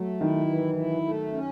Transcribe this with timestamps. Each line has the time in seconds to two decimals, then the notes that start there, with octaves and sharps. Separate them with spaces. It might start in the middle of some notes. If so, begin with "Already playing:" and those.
Already playing: F#3 A3
0.21 D#3 E4
0.49 E3
0.76 E4
1.05 A3
1.33 C#4